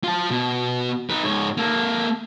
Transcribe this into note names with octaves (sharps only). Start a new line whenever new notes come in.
F4 A5
B2
D#4 B4
G#2 C#5
A#3 A4